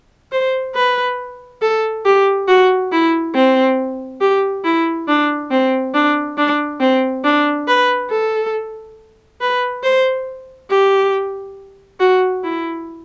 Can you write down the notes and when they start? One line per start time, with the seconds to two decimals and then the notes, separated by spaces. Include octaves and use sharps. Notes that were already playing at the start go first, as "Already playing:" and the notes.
0.32 C5
0.75 B4
1.62 A4
2.06 G4
2.48 F#4
2.92 E4
3.35 C4
4.21 G4
4.64 E4
5.08 D4
5.51 C4
5.94 D4
6.38 D4
6.80 C4
7.24 D4
7.68 B4
8.10 A4
9.41 B4
9.83 C5
10.70 G4
12.00 F#4
12.44 E4